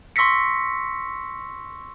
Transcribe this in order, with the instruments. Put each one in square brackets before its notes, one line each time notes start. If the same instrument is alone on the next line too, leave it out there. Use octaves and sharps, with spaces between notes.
[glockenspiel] C6 C#6 E6 A#6 B6 C#7